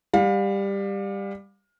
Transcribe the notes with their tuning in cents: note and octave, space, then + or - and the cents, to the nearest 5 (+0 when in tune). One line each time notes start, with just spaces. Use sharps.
G3 +15 F5 +30